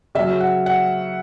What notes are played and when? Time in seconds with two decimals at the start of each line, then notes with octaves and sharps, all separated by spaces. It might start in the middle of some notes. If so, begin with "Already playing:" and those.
0.15 C#3 F#3 E5
0.40 F#5
0.66 F#5